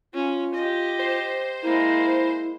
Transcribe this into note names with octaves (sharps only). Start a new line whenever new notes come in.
C#4 F4
G4 D#5
C5
G#3 A#3 E4